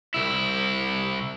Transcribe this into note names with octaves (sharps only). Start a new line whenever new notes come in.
C2 E4